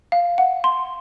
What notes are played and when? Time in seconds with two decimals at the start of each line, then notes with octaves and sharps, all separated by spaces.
0.12 F5
0.38 F#5
0.64 C6